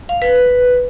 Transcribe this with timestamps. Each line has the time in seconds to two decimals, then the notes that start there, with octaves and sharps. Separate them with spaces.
0.09 F5
0.22 B4